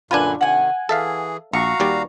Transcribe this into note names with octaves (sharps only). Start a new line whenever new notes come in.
F#2 A#2 D3 D4 F4 B4 G#5
C3 D#3 F#5 G#5
E3 G#4 A4 E5 F5
A#1 F#4 F5 A#5 C#6
D#2 G3 D5